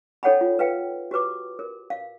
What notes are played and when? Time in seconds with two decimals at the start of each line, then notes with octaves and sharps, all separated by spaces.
0.23 D#4 A4 C#5 F#5 G5 B5
0.41 F4
0.59 B4 F5 G5
1.11 F#4 G4 B4 D6
1.59 A#4
1.90 F5